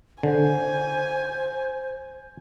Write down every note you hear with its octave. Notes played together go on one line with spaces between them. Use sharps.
D3 C5 G#5